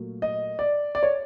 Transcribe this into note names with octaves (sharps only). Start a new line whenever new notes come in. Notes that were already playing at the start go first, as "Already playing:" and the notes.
Already playing: A#2 F#3 A3
D#5
D5
D5
C#5